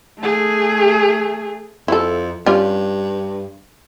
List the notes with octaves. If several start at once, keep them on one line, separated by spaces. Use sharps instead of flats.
A3 G#4
F2 E4 A4
G2 G3 C#4 F4